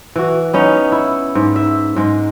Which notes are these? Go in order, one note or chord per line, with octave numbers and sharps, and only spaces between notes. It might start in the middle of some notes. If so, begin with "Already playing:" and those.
E3 F#4
B3 C#4 D#4
E4
G#2
E5
G#2 G#3